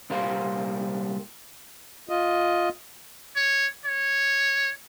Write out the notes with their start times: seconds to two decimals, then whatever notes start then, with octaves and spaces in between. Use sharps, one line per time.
0.10 C2 A#2 G3 A#4 C5 F5
2.09 F4 D#5
3.36 C#5
3.86 C#5